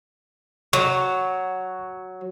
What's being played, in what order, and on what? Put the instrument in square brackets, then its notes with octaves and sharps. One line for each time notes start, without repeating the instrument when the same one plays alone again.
[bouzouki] F#3 [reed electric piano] C#6